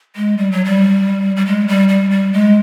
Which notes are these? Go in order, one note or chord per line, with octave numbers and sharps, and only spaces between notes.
G#3
G3
F#3
G3
G3
G#3
G3
G3
G3
G#3